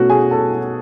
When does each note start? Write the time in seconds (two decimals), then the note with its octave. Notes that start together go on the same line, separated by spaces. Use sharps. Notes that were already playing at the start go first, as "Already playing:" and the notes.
Already playing: B2 A3 C#4 F#4
0.10 G#4 G#5
0.31 A4 A5